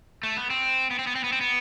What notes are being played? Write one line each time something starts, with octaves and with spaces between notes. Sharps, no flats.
A3
B3
C4
B3
C4
B3
C4
B3
C4
B3